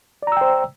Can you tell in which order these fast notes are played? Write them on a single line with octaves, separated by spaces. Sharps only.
D5 A#5 E6 G5 C5